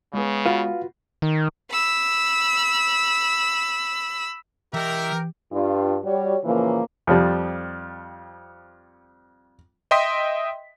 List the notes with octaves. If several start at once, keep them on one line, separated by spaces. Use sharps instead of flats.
C#3 G#3 B3
F4 F#4 B4 F5
D#3
B5 E6
E3 G4 A#4 D#5 E5
G2 F4
G3 F#4 C#5
A#2 C#3 E3 F3 A#3
F2 F3 G3
D#5 E5 G5 C6 D#6 B6